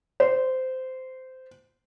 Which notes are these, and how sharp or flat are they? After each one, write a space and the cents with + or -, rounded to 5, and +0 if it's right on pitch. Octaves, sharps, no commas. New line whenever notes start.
C5 -15